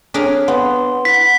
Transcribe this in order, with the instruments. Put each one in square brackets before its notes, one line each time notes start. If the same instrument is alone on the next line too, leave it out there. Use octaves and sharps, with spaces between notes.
[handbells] C4 C#5 B6 [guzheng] D4 G#4 A#4
[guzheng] B3 [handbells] C6
[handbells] E4 F#5 [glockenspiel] B6